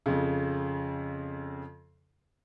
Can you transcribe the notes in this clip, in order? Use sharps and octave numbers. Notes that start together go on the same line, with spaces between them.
F2 C#3